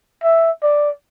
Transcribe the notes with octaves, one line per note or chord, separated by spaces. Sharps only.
E5
D5